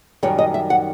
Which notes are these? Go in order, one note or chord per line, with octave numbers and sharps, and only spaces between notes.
F#2 D#3 G3 C#5
D#5
E5
F#5